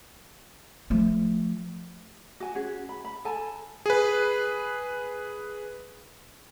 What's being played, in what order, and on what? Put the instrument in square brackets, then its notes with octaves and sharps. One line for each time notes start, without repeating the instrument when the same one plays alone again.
[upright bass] F3 A3
[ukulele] F#4 G#5
C#4 F#4 G#4
B5
B5
A4 G#5 A5
[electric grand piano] G#4 B4